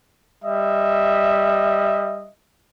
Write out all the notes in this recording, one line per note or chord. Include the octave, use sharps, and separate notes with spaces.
G3 D#5 E5